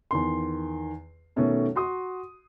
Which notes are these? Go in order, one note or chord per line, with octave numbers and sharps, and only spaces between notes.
E2 D#3 C6
B2 D#3 A3 C#4 A4
F#4 C6 D#6